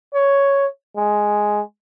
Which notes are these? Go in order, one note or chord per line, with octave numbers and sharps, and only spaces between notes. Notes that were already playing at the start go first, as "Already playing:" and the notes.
C#5
G#3